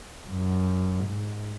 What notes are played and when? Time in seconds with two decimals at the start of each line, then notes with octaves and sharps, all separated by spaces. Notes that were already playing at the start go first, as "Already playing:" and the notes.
0.29 F#2
1.06 G#2